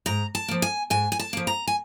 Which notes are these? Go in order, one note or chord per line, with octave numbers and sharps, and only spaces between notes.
G#2 A#5
A5
F3 A#3
G#5
G#2 G#5
G#5
A5
F3 A#3
A#5
G#5